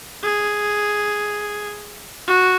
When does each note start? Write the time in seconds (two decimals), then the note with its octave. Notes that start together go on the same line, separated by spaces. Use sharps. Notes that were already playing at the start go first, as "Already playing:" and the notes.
0.23 G#4
2.28 F#4